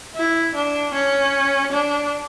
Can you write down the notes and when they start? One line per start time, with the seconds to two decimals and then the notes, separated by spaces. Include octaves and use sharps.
0.16 E4
0.55 D4
0.94 C#4
1.72 D4